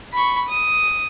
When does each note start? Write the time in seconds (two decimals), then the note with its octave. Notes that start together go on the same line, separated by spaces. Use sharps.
0.13 B5 C#6
0.48 D#6